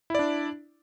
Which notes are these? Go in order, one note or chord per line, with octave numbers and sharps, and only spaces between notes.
D4 E4 D5